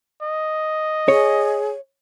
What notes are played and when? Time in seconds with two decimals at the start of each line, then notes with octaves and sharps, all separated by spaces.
0.22 D#5
1.08 G#4 C#5